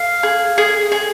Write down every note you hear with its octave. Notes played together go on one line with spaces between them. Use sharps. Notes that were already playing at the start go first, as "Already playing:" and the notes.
Already playing: F5
G#4
G#4
G#4